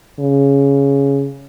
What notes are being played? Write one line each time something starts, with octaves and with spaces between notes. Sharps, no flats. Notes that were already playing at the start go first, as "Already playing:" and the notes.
C#3